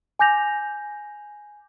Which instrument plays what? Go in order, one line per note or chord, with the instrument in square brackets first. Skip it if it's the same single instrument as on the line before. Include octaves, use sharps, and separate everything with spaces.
[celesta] G#5 D6 G6 A#6 F7